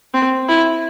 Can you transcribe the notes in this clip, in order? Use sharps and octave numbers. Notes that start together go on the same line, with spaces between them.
C4
E4